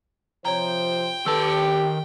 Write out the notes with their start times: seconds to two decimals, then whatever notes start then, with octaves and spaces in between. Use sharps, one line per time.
0.45 C3 F3 C5 C#5 G5 A#5
1.26 D#3 G4 A4 B4 A5 E6